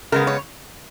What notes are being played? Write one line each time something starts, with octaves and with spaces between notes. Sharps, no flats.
C#3 G#3 B3 A#4
C#5